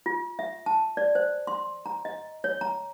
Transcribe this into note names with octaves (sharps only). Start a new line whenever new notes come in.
F4
E5
A5
D5
C5
C6
A#5
D#5
C#5
A#5